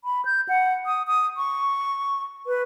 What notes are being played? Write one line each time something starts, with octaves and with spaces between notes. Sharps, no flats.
B5
G6
F#5
D#6
D#6
C#6
B4